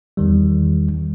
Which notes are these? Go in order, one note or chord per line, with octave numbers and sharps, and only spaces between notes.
E2 D#3 G3